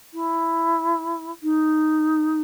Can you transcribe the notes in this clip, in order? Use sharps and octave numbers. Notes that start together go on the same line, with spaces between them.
E4
D#4